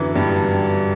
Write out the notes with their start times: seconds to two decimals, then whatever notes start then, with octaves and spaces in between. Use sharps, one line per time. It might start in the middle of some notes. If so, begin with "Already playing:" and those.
Already playing: F#2 D3 E3 F#3
0.15 G2 G3